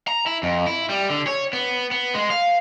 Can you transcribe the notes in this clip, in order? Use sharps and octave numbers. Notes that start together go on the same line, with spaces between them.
A#5
E4
F2
E4
G3
D3
C#5
B3
B3
G#3
F5